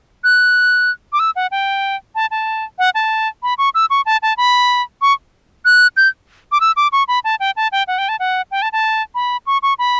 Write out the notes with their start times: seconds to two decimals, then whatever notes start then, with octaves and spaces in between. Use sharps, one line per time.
0.24 F#6
1.13 D6
1.19 E6
1.36 F#5
1.51 G5
2.15 A5
2.31 A5
2.79 F#5
2.95 A5
3.43 B5
3.58 C#6
3.75 E6
3.90 C#6
4.06 A5
4.22 A5
4.37 B5
5.02 C#6
5.65 F#6
5.97 G6
6.52 D6
6.61 E6
6.77 D6
6.92 C#6
7.08 B5
7.24 A5
7.40 G5
7.57 A5
7.72 G5
7.88 F#5
7.98 G5
8.09 A5
8.20 F#5
8.51 G5
8.62 A5
8.73 A5
9.15 B5
9.47 C#6
9.63 C#6
9.79 B5